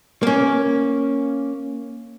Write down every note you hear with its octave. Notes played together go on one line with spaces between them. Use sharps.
A#3 C#4